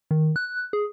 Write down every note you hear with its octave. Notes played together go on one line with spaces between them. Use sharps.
D#3
F#6
G#4